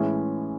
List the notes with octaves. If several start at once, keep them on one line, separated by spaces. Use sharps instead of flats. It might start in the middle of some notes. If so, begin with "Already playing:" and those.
Already playing: A2 E3 G#3 C#4